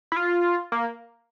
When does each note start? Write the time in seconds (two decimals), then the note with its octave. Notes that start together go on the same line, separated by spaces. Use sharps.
0.12 E4
0.16 F4
0.72 A#3